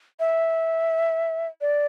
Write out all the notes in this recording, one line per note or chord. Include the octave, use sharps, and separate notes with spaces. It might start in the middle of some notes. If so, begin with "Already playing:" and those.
E5
D5